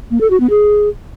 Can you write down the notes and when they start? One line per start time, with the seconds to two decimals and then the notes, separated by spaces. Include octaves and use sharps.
0.11 A#3
0.21 A4
0.30 F#4
0.40 B3
0.50 G#4